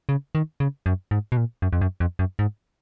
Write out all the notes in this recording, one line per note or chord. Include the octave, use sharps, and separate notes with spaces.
C#3
D#3
C#3
F#2
G#2
B2
A#2
F#2
F2
F#2
F2
F#2
G#2